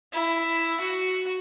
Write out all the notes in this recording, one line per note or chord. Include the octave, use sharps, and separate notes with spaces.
E4
F#4